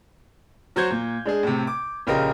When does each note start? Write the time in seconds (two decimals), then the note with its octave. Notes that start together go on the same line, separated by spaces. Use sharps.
0.76 F#3 F#4 C5 G6 G#6
0.91 A#2
1.25 G#3 D4 G#4
1.43 A2 C3
1.67 D6
2.07 A#1 C#3 G4 A#4 D#5